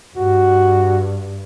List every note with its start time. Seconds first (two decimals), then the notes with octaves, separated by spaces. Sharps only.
0.17 G2 F#4